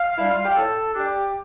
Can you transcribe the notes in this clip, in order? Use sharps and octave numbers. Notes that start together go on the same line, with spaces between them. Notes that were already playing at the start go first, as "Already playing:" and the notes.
Already playing: F5
G3 D4 E4
F4
G4
A2 A4
G3 D4 G4